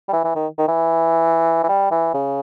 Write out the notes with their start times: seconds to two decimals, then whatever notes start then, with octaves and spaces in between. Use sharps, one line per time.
0.09 G3
0.13 E3
0.24 E3
0.35 D#3
0.58 D#3
0.68 E3
1.64 E3
1.69 G3
1.91 E3
2.14 C#3